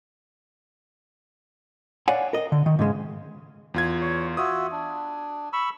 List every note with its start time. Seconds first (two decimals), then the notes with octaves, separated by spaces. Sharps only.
2.08 C#5 D5 F5 F#5 G#5
2.33 A#4 D#5
2.52 D3
2.66 D#3
2.79 G#2 C#3 G#3
3.74 E2 F4 G#6
4.01 C#5
4.37 F4 F#4 E5 D#6
4.72 D4
5.53 B5 C#6 E6